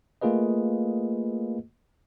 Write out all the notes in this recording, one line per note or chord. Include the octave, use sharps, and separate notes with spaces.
A3 A#3 F4 G#4 B4 D#5